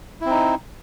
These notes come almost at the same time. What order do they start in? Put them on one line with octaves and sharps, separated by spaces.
E4 C4 D#4